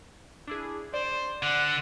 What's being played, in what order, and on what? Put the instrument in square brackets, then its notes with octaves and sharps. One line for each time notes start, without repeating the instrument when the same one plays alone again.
[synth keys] D4 E4 G#4
[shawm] C5 [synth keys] D5
[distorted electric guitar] D3 [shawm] F#5